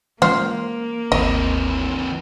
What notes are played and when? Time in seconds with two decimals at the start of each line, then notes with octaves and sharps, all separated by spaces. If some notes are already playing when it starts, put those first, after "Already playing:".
0.22 E3 G#3 A#3 C#4 F4 C5
1.12 G#1 D#2 E3 C4 D#5